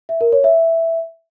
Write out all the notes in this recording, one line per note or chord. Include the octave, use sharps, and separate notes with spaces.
E5
A#4
C#5
E5